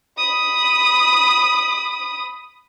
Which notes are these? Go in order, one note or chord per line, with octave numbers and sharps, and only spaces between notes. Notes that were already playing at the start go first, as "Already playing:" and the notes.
B5 D#6